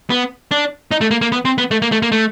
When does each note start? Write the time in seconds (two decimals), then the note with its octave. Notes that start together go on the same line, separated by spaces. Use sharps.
0.10 B3
0.51 D4
0.91 D#4
1.01 A3
1.11 A#3
1.21 A#3
1.32 B3
1.45 C4
1.58 B3
1.71 A3
1.82 A#3
1.92 A3
2.02 A#3
2.12 A3